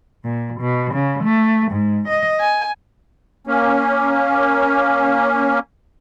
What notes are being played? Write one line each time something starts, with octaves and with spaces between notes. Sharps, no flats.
A#2
B2
C#3
A3
G#2
D#5
G#5
A#3 C#4